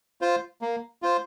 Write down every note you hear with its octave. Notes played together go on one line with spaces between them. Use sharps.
F4 C5
A#3
F4 C5